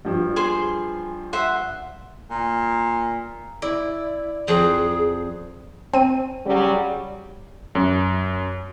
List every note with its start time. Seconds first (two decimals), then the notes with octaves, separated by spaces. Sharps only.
0.05 G2 F3
0.36 G#4 C5 C6
1.33 C5 E5 F#5
2.31 A#2
3.62 E4 D5
4.48 F2 G#4
5.94 C4 D#7
6.46 C#3 F#3 G3
7.75 F#2